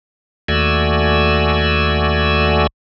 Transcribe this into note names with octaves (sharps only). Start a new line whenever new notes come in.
D#2 A3 F#4 D5 G#5 E6